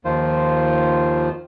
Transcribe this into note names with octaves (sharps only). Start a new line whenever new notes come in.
D#2 D#3 F3 F4 C5